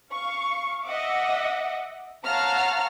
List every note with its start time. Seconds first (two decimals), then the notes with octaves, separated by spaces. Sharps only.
0.11 F5 C#6
0.87 D#5 E5 F#5 D6
2.23 C#5 F5 F#5 A5 A#5 F6